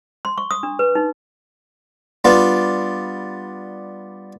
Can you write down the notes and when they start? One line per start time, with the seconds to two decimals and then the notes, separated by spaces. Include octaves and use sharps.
0.25 C6
0.38 C#6
0.51 D#6
0.63 D4
0.79 B4
0.95 D#4
2.25 G3 B3 D4 F4